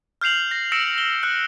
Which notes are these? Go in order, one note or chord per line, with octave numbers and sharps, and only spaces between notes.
F6 G6 C7 F7 F#7
A#6
E6 A#6 C#7 D7 E7
G7
F6 F#6 C#7